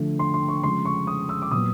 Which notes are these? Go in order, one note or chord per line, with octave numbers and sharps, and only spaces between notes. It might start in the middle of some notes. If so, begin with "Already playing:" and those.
Already playing: D3 F3 A3
C6
C6
C#6
C#3 F3 G#3 C6
C#6
D#6
E6
D6
A#2 F#3 B3 D#6